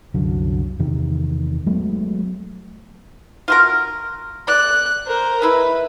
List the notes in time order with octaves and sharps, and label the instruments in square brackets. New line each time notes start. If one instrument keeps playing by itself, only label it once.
[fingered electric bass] C2 F#2 D3 F#3
E2 C3 D#3
F#3 G#3 A3 B3
[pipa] F4 F#4 A#4
[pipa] D5 [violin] F#6
[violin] A#4 C5
[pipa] G#3 E4 [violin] B4